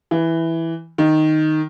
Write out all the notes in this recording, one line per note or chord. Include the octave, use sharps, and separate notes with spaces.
E3
D#3